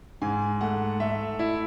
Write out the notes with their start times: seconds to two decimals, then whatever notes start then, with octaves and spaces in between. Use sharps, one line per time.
0.22 G#2 G#5
0.61 A3 F#5
1.00 A3 E5
1.39 E4